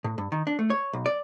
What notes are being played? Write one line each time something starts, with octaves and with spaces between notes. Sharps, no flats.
A2
G2
D#3
D4
A3
C#5
B1
D5